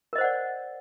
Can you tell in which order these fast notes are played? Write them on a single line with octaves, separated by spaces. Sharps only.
A#4 D#5 C5 F#5 D5